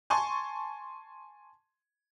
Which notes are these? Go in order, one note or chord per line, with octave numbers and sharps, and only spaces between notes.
G#5 A5 C6 C#6